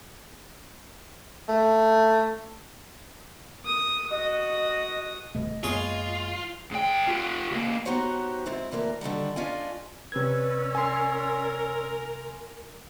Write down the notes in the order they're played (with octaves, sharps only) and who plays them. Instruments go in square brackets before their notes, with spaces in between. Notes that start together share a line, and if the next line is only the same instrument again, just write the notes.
[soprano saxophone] A3
[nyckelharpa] D#6
[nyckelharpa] F#4 D#6 [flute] D#5
[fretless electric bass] D#1 B2 A3 [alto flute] D#5
[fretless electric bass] F#2 A#3 B3 [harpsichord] G#3 G#4 C#5 [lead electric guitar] F4
[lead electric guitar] G#2 G5
F4 G4
C#2 A#3
[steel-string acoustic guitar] B3 D#4 F#4 G4 C5 C#5
G#2 C4 E4
D2 E3 A#3 A#4
D3 D#3 F#3 G3
C#4 D4 F4 D#5 F5 G#5
[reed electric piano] C3 G#6 [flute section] C#4 D5 E6 [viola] B4
[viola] A#4 [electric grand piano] G#5 C6